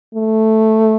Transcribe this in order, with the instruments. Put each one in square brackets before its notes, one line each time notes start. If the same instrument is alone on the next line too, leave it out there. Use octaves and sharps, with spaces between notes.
[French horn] A3